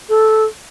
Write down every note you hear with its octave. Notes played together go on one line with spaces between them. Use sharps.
A4